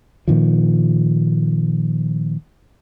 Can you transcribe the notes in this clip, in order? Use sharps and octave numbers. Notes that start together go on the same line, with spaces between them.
A#2 D#3 F3